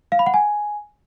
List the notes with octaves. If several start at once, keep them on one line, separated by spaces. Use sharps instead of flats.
F5
B5
F#5
G#5